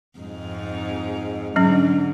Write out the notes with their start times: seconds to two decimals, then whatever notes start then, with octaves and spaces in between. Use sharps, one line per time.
0.19 F2 G#2 D#4
1.56 G#2 D3 F#3 C#4